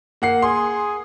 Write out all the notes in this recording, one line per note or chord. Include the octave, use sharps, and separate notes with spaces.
A#3 F#5 C7
G#4 C6